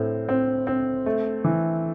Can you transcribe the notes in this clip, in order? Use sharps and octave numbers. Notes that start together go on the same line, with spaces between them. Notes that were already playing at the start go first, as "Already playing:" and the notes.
Already playing: A2 C4
C4
C4
A3
E3